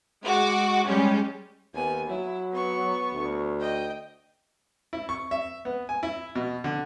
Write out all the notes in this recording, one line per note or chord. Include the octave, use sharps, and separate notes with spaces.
G#3 F#4 D6
G3 G#3 C#4 G4
D#2 B3 G#5
F#3 E4
B3 C#6
D2
D#5 G5
E4
C#6
E5
B3
G#5
E4
B2
D3